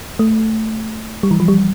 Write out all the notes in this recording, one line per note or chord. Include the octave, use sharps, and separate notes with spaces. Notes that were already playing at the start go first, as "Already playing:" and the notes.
A3
G3
E3
F3
G3